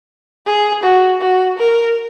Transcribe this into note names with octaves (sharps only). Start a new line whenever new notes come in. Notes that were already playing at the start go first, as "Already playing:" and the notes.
G#4
F#4
F#4
A#4